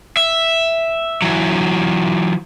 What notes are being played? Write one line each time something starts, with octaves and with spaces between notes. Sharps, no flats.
E5
E3 F#3